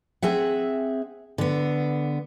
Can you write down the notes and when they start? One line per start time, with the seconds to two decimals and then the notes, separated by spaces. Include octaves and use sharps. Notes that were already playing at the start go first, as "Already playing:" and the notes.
0.22 C4 G#4 E5 F#5
1.38 D3 B3